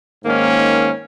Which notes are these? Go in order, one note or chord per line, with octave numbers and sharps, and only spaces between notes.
G#2 D#3 A#3 C#4